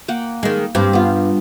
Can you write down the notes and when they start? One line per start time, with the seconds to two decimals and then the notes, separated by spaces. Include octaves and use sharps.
0.08 A#3 F#5 G5
0.43 D#3 G#3
0.75 G2 C4 G4
0.93 B3 F4